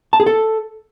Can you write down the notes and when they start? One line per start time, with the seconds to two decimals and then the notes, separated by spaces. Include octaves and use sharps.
0.13 A5
0.20 G#4
0.26 A4